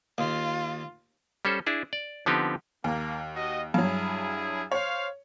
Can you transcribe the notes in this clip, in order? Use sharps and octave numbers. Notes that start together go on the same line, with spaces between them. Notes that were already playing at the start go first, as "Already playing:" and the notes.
D#2 F4
G3 C#4 A4 C5
D4 E4 G#4
D5
D3 F3 B3 C4 D#4 G4
D#2 A#3
F#4 D#5
G2 F#3 E4 G#4
C5 C#5 F5